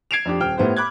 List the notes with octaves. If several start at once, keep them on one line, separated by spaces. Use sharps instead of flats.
G#6 C7 D7 E7 F7
F2 D4 G4
D#1 G5 F6
A2 B3 G4 C5
B5 D6 F#6 G#6